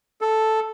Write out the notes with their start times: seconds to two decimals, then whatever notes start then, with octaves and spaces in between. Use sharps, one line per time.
0.21 A4